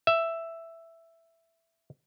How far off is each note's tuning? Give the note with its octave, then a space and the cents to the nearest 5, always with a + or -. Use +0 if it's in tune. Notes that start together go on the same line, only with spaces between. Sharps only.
E5 +5